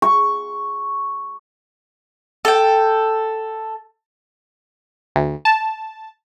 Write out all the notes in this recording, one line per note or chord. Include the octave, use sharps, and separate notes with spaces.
C#6
A4 G5
D2
A5